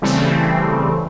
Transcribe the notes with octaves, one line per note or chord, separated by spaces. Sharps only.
C#3 E3 G3 A3 C4